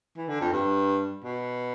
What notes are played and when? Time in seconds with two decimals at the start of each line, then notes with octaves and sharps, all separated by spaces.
0.17 E3
0.28 D3
0.41 F2
0.53 G2
1.24 B2